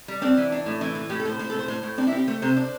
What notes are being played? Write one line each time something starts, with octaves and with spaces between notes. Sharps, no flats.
G3
C4 D4
E3
D4
A2
E3 E4
E3
A2 G4
A4
A2 C5
A2 C5
A4
A2 C5
A2 C5
A2
C4 D4
E4
C4 G4
A3 C5
C3 C5
D4